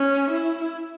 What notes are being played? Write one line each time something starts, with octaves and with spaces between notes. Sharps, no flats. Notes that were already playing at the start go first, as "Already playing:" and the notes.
Already playing: C#4
E4